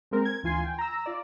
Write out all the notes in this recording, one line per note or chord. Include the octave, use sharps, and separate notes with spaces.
G#3 A#3 C4 A#4
G#6
D2 E3 F4 G#5 C6 G#6
G5
A#5 E6
F4 D5